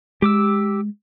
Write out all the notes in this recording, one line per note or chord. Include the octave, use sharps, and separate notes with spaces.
G#3 G4 D6 E6